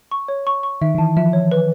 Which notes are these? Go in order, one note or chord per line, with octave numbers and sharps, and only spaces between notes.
C#6
C#5
C#6
C#6
D#3 E5
D#3
E3 A5
F3 E5
C#5
B4